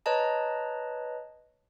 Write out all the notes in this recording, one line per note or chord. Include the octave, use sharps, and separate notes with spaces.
B4 C#5 D#5 A5 A#5